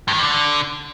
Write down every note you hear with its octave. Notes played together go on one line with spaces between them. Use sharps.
G2
D#3
G2
D3